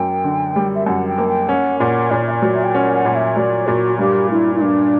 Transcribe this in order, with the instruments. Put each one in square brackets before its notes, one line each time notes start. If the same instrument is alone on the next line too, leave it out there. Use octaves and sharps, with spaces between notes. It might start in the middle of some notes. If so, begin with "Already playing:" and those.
Already playing: [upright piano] F#2 A#3 [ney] G5
[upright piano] D3
G3
[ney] E5
[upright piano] F#2 [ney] F#5
[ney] G5
[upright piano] A#3
[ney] G5
[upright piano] C#4 [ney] F#5
[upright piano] A#2 [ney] F#5
[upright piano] A#2 [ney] C#5
[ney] E5
D5
[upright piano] F#3
[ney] E5
G5
[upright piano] C#4 [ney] F#5
[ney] F#5
[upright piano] A#2
[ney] E5
[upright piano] F#3 [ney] D5
[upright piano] A#2 [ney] F#4
[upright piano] G2 [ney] G4
[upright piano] G2 [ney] E4
[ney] E4
[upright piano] G2 [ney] D4